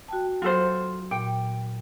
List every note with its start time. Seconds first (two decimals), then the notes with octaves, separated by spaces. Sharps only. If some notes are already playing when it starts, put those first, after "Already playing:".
0.08 F#4 G5 A5
0.42 F#3 F4 A4 C5
1.11 A#2 G5